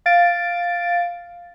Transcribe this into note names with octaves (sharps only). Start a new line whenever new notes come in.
F5 A6 D7